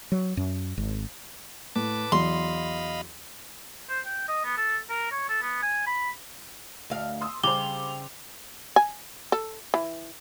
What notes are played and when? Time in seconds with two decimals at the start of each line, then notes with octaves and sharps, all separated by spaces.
0.12 F#3
0.37 F#2
0.77 G#1
1.75 A2 B4 A5 D6
2.12 E2 F#3 D#5 F5 B5 C6
3.89 C5
4.06 G5
4.28 D#5
4.44 B3
4.58 A4
4.90 A#4
5.12 C#5
5.29 A4
5.42 B3
5.62 G#5
5.87 B5
6.90 D2 F5
7.21 C6 D#6 E6
7.44 C#3 G3 C5 G5 D6 F7 G7
8.76 G#5
9.32 A4
9.74 E3